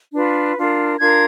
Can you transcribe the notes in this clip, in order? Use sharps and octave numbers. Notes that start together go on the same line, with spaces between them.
D4 F4 B4
D4 F4 A#4
D4 F4 A#4 G#6